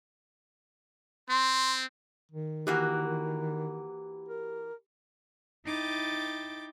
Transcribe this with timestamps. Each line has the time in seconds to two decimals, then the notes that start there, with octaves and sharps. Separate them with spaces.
1.29 C4 C6
2.31 D#3
2.67 E3 A#3 F#4 G4
4.28 A#4
5.66 D#4 E4 G5 D6 A6